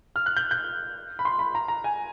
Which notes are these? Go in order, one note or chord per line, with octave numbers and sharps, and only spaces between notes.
F6
F#6
G6
G6
B5
C6
B5
A#5
A#5
G#5